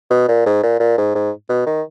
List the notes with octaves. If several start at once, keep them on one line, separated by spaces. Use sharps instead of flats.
B2
A#2
G#2
A#2
A#2
G#2
G#2
B2
D#3